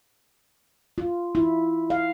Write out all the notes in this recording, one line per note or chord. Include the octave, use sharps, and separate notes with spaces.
F4
E4
F5